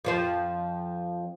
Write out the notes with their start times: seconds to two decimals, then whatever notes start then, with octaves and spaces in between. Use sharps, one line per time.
0.05 F2 F3 C5